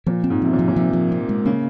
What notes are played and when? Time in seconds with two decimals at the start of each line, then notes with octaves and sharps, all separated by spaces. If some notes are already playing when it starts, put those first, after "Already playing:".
0.07 A#2 F3
0.24 C4
0.30 G#2
0.42 C3 F3
0.53 A#2
0.59 F3
0.68 A#2
0.76 C3 F3
0.93 F3
1.12 C4
1.29 G#3
1.45 C#3 A#3